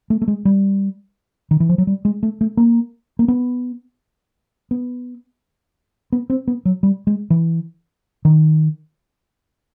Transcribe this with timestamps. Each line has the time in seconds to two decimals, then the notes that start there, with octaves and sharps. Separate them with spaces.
0.10 A3
0.22 A3
0.28 G#3
0.45 G3
1.51 D#3
1.60 E3
1.69 F3
1.78 F#3
1.87 G3
2.05 G#3
2.23 A3
2.41 A3
2.57 A#3
3.19 A#3
3.28 B3
4.71 B3
6.12 B3
6.30 C4
6.48 B3
6.65 F#3
6.83 G3
7.07 G#3
7.30 E3
8.25 D#3